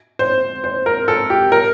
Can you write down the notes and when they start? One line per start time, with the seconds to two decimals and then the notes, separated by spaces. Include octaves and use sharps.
0.19 C5
0.64 C5
0.86 A#4
1.08 A4
1.30 G4
1.52 A#4